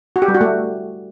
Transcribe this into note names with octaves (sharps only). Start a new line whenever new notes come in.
F#4
G4
G3
F#4
A3